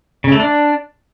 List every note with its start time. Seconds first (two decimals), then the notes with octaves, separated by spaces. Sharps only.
0.24 C#3
0.32 A3
0.40 D4